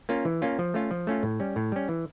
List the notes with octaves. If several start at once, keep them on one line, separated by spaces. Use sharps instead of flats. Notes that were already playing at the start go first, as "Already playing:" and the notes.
A#3 C#4 F4
E3
A#3 C#4 F4
F3
A3 C#4 F4
F3
A3 C#4 F4
A2
G3 C#4
A2
G3 C#4
E3